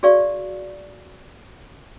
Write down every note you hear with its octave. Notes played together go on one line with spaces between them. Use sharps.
F#4 G#4 D5 F5 C#6